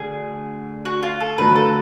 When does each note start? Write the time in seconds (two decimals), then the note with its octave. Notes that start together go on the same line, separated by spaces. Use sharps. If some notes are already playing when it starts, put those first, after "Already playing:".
Already playing: D2 D3 G#4
0.85 F#4
1.03 F4
1.20 A4
1.38 D2 D3 F#3 A3 F4 B4
1.56 A4